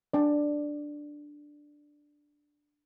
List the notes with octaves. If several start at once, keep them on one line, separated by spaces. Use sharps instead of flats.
D4 D5